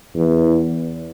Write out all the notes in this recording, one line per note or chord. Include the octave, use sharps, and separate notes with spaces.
E2